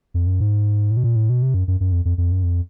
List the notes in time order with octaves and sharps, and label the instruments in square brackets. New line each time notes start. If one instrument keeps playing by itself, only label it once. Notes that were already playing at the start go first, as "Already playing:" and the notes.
[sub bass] F2
F#2
G#2
A2
B2
A#2
A2
B2
C3
F#2
F#2
F#2
F2
F2
F2
F#2
F2